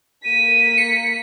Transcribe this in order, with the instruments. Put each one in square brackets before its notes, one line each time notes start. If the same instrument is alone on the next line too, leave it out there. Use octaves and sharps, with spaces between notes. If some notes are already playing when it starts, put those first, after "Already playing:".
[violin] A#3 B6 [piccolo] D#7
[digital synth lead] C#7